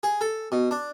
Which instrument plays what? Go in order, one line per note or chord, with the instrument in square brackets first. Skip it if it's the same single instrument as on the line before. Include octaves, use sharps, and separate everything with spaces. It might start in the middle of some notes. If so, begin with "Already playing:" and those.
[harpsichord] G#4
A4
B2
D4